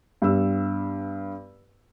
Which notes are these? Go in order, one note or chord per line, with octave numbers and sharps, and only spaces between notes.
G2 G3 B3 E6